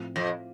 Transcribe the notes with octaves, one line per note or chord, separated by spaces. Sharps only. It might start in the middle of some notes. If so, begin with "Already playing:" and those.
Already playing: A2 F3 C4 F4
F2